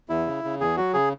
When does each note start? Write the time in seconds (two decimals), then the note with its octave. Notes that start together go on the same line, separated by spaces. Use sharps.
0.10 E2 E4
0.27 C#3
0.44 C#3
0.60 E2 G#4
0.77 F#3 F#4
0.94 C#3 G#4